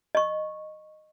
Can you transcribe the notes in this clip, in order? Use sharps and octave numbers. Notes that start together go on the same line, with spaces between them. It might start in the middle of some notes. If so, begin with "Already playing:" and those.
D#5 C#6